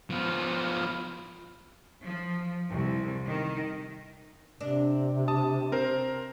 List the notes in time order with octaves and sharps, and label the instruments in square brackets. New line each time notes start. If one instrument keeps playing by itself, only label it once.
[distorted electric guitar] F3 B3
[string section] F3
C2
D#3
[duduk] C3 [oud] D4
[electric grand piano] A5 D#6
C4 A#4 C5